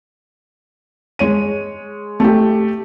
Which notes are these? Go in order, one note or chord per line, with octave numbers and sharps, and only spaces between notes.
G#3 C#5 D#7
A3 G4